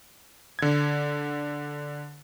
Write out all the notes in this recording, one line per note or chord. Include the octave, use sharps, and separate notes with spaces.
D3 G#6